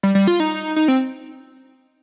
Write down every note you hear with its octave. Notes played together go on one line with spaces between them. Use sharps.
G3
G3
F4
D#4
D#4
C4